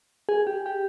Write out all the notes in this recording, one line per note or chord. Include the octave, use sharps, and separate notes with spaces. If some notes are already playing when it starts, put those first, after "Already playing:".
G#4
G4
G4